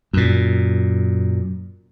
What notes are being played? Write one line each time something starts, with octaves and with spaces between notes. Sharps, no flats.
F#2 A#2